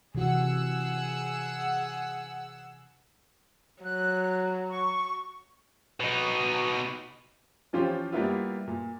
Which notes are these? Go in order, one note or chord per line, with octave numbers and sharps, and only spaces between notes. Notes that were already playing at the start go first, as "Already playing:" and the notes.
C3 E3 F#4 G#4 F#5 E6
F#3 F#6
C#6
B2 D#4
E3 F3 C#4 F4 G4 C5
G3 A#3 B3 E4 F4
A#2